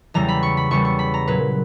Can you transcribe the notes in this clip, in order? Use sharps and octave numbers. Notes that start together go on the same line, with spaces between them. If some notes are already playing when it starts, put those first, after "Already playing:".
E2 C#3 E3 G3 A#5
B5
C#6
B5
E2 C#3 E3 G3 C#6
C#6
B5
A#5
A#2 F#3 B4